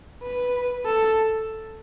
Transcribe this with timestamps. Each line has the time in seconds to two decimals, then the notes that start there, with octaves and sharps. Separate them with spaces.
0.23 B4
0.86 A4